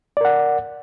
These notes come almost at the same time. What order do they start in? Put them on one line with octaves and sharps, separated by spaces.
D5 A#4 F#5